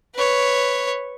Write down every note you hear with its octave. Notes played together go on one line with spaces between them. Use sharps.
B4 C#5